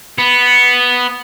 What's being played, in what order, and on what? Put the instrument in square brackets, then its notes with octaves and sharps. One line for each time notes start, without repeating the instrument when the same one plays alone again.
[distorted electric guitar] B3